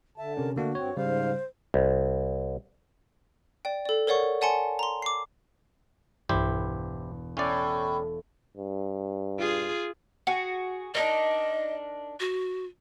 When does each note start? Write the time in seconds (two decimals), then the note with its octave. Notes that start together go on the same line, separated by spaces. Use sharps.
0.18 D3 E5 A5
0.37 C3 C#4 A#4
0.56 D3 A3 A#3 D4 F#4
0.75 G2 C4 C#5
0.97 G#2 C#3 G3 C5 F5
1.74 C2
3.65 D5 G5
3.85 A4 D5
4.07 A#4 C#5 D5 F#5 C#6
4.41 D5 F#5 G#5 A5 C6 C#7
4.79 A#5 C6
5.02 D6 C7
6.29 E1 B1 G2 E4 G4 C5
7.37 A2 C#4 D5
8.57 G2
9.39 F4 G#4
10.27 F#4 G#4
10.95 D4 D#4 A#4 D#5
12.20 F#4